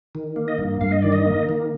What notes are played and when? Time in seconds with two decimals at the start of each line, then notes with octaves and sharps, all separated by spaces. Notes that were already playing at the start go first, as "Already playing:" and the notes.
0.15 D#3
0.36 A#3
0.48 D#5
0.58 G2
0.81 G2 F5
0.92 D#5
1.02 D#3 D5
1.12 D#5
1.26 A#3
1.49 D#3